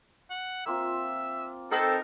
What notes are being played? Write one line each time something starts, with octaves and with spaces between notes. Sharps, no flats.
F#5
A#3 C4 F4 E5
C4 D#4 A4 A#4